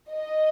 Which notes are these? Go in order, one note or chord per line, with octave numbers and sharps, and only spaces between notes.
D#5